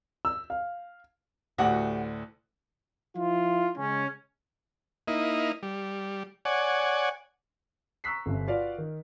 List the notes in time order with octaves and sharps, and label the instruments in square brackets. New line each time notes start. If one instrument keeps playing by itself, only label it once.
[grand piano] E6
F5
[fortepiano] D2 A2 F#5 [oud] F#4 G4
[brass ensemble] F3 E4 F4
C#3 G#3 C#4
[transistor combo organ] A#3 D#4 E4 D#5
G3
C#5 D5 F#5 G#5
[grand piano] A#5 C#6 E6 F#6 B6 C7
G1 C3
F4 F#4 B4 D5 F5
D#3